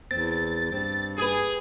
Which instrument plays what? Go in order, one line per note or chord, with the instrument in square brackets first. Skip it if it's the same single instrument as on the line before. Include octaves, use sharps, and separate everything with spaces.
[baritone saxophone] E2 [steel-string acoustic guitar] C4 [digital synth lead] A6
[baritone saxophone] G2 [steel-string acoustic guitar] C4
[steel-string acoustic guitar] G4 B4 [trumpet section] G#4